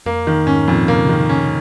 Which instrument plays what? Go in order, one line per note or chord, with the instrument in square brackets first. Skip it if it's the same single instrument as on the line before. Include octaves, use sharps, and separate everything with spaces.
[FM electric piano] F2 [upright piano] A#3
[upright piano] D#3
[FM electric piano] G#2 [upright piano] C#4
[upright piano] F2 [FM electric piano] A#2
[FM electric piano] C3 [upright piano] A#3
[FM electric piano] C#3
[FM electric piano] C3 [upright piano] D#3
[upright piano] C#4